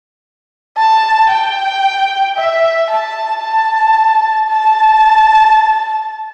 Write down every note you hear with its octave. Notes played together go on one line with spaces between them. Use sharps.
A5
G5
E5
A5
A5
A5